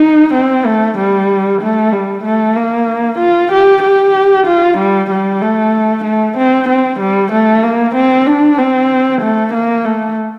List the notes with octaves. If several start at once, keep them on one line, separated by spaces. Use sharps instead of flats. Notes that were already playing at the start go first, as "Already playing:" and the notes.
Already playing: D#4
C4
A3
G3
A3
G3
A3
A#3
F4
G4
G4
F4
G3
G3
A3
A3
C4
C4
G3
A3
A#3
C4
D4
C4
A3
A#3
A3